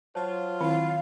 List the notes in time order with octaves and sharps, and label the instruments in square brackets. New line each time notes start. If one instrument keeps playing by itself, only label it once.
[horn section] F#3 F4 [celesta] C5 C#5 A5
[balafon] D#3 C4 E4 [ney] F5